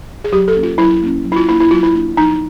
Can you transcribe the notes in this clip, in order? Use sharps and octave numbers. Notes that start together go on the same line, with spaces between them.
G#4
F#3 G4
A4
A#3 C#4
F4
F#3 E4
A#3 C#4
F#3
E4
F4
A#3 D4 E4
E4
F#3 F4
E4
A#3 D4
F3 D#4